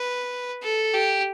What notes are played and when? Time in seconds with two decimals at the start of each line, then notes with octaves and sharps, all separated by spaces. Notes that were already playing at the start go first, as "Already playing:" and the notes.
Already playing: B4
0.63 A4
0.94 G4